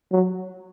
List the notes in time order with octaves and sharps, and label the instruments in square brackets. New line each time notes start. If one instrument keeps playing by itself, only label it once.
[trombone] F#3